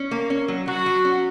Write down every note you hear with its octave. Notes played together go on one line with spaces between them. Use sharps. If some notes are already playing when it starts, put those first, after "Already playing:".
Already playing: C#4
A#3
C#4
F#3
F#3 F#4
F#3
C#4